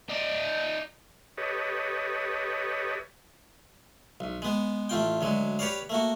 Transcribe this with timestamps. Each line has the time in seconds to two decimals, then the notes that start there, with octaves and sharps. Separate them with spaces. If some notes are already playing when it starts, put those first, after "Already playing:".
0.09 D#4 D5
1.38 G4 A4 B4 C#5 D#5
4.20 B1
4.42 G#3 B3
4.89 A1 A3 F4 G5
5.21 D2 F#3 G#3
5.59 G4 B4 C#5 D5 F5
5.90 A3 A#3 F#4